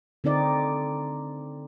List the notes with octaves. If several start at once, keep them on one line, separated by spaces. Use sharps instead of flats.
D3 C4 D#4 D5